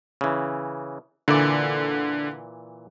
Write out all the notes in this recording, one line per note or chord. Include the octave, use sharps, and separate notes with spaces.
C#3 E3
A#2 D3 E3 D5